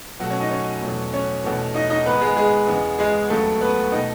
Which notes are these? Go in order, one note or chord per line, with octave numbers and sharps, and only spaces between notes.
B2 F#3 A3 F#4
C#4 C#5
D#4 D#5
C#4 C#5
E2 B2 F#3 A3
C#4 C#5
E2 B2 A3
D#4 D#5
D#4 D#5
G#2 D#3 G#3 B3 B4
G#3 G#4
G#3 G#4
E2 C#3 G#3 B3
G#3 G#4
D#2 C#3 F#3 A3 B3 A4
B3 B4
B2 A3 D#4 D#5